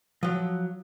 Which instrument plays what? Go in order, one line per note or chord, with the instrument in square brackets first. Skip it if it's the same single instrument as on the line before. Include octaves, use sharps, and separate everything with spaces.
[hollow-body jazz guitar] F3 F#3